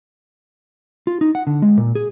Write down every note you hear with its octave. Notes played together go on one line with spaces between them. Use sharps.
F4
D#4
F#5
D3
G#3
A#2
G#4